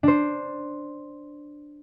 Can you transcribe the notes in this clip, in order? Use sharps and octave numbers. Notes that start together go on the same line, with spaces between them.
D4 C5